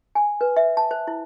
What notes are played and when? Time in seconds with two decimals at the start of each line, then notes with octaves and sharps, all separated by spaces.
0.15 G#5
0.41 B4
0.56 E5
0.77 A5
0.91 C5
1.07 E4